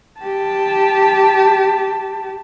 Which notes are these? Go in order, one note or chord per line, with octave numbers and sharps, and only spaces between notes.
G4 A5